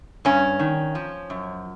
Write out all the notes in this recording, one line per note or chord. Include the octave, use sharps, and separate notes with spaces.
G2 C#4
D#3
F3
F#2